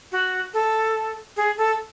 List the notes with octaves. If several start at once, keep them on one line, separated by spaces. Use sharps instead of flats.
F#4
A4
G#4
A4